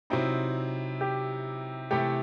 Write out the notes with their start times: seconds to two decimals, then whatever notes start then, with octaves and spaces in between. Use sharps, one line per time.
0.10 C3 F#3 C4 D#4 E4
1.01 G4
1.91 C3 E3 A3 E4 G4 A4